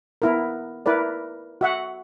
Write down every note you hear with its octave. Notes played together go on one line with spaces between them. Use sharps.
B3 E4 A#4
E4 A#4 B4 D5
F#4 E5 F#5